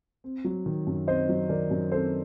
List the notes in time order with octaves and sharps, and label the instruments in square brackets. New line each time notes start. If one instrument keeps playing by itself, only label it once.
[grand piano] C4
F#3
D#3
F#2
C4 C5 D#5
F#3
D#3 A#4 D5
F#2
C4 A4 C5